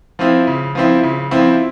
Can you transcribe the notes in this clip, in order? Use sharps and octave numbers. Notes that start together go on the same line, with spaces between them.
F3 C4 E4
C#3
F3 C4 E4
C#3
F3 C4 E4